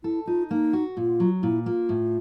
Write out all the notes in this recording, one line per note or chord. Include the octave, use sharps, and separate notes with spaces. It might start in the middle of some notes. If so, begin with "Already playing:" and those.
E4 A4
D#4 F4
A#3 D#4
F#4
A#2 F4
F#3
A#2 E4
A#3 F4
A2